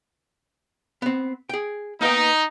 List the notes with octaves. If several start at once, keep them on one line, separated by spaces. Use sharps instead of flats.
B3 C4
G#4 G5
A#3 B3 D#4 G5